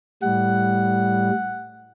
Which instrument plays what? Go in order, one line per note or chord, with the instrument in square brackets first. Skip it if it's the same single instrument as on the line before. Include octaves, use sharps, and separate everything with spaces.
[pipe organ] A2 G3 [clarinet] F#5